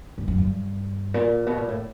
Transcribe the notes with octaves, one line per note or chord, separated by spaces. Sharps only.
G2
F#2
G2
A#2
B2
A#2
A2